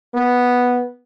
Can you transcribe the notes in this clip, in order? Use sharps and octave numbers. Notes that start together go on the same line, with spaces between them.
B3